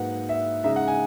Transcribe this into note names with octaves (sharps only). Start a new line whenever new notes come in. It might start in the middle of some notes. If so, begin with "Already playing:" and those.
Already playing: G#2 F#3 A#3 D#4 B4 F#5
E5
C#3 G#3 D#4 E5
F#5
G#5